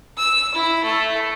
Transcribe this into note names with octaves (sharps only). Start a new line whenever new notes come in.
E6
E4
A3